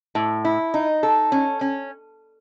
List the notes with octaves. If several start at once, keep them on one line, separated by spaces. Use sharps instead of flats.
A2
E4
D#4
A4
C#4
C#4